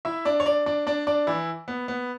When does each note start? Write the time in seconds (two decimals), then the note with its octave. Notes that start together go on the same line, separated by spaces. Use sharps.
0.05 E4 E5
0.25 D4 D5
0.40 C#5
0.46 D4 D5
0.66 D4 D5
0.87 D4 D5
1.07 D4 D5
1.27 E3 E4
1.68 B3
1.88 B3